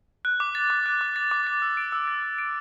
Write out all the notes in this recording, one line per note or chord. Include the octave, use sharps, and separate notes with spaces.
F#6
D6
A6
D6
F#6
D6
A6
D6
A6
E6
D7
E6
A6
E6
D7